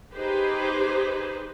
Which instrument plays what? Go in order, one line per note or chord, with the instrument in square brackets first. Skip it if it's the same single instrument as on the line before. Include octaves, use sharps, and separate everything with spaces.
[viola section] D#4 G4 G#4 B4 C5